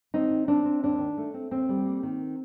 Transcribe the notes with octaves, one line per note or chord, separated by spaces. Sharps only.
D#3 C4 D#4
D#3
C4 D4
C4
D#2 D4
D#3
A3
C4
D#2 C4
G3
A#3
D#3